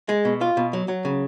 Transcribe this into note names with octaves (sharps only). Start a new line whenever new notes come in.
G#3
B2
F4
B2
F#3
F#3
C#3